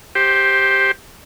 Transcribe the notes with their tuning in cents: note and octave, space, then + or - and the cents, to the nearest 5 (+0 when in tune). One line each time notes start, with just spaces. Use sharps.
G4 +0 C5 +15